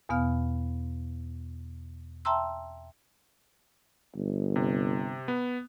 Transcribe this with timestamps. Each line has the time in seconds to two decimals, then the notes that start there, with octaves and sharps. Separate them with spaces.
0.09 E2 B2 B3 F5 F6
2.25 E5 G5 A5 A#5 C6 E6
4.15 G1
4.56 C3
5.28 B3